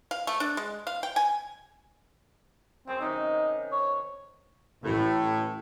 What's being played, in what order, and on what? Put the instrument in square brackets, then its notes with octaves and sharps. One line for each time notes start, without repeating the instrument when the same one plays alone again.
[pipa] F5
A3
D4
G#3
F5
G5
G#5
[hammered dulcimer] F#2 G#4 C5 [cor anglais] C4
[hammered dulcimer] C3 D#3 C#4 [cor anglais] D#4
[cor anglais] C#5
[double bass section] A1 [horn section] A2